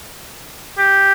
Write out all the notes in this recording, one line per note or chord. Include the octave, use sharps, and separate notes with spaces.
G4